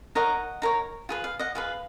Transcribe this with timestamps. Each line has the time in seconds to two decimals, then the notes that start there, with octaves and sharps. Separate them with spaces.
0.15 D#4 A#4 C#5 D#5 F#5
0.62 D#4 A#4 C#5
1.09 F4 G#4 B4
1.24 F5
1.39 D#5 F#5
1.55 F4 G#4 B4 F5